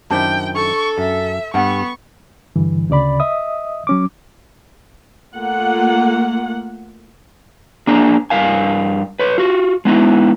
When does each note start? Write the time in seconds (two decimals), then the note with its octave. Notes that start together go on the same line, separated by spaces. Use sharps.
0.11 F#2 D#3 D4 E4 C5 G5 A5
0.56 A4 C#6
0.98 F#2 E5
1.54 G2 B3 F#5 G5 C#6
2.56 G2 D3 E3
2.90 D2 C#3 D5 B5
3.20 D#5 E5 D#6
3.87 F#3 C#4 D6
5.35 A3 A#3 F4 F#5
7.87 A#3 D4 G#4 A#5
8.30 G2 A#4 F5 G#5
9.19 B4 C#5
9.38 F4 F#4
9.85 G#3 B3 D#4 E4